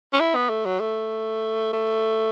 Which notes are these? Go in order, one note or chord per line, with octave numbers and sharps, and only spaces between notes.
C#4
E4
B3
A3
F#3
A3
A3